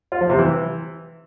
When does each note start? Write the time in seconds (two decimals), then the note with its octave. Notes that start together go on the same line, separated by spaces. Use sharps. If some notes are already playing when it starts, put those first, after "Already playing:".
0.12 F4
0.21 F3
0.30 C3
0.39 E3